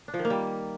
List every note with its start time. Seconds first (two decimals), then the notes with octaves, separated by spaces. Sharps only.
0.08 D4
0.14 F3
0.19 D#3
0.25 A#3
0.30 G3